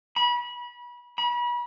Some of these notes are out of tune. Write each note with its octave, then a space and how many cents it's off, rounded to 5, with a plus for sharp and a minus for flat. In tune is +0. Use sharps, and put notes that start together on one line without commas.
B5 -30
B5 -35